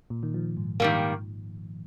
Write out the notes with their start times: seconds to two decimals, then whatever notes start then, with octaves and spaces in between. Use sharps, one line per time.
0.10 A#2
0.23 D#3
0.34 F3
0.57 G#2
0.80 G#2 D#3 G3 A#3